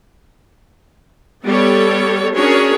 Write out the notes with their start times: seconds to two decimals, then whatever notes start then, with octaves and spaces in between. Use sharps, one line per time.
1.44 G3 B3 A4 C#5
2.35 C#4 D4 F#4 G#4 A#4 C#5